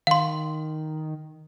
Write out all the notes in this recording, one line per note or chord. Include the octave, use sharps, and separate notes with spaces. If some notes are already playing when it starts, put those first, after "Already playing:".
D#3 F5 C6